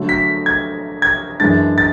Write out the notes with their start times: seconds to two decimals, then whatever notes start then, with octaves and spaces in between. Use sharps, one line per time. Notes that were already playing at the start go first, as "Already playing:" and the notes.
Already playing: D3 F#3 A3
0.09 B6
0.46 G#6
1.02 G#6
1.40 F#2 E3 G#3 D4 A6
1.78 A6